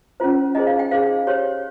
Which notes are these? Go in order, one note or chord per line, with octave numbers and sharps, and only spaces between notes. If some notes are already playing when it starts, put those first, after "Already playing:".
C#4 F4 C5
D#4 G#4 C5 D#5
F5
G5
D#4 G#4 C5 F5
G4 C5 C#5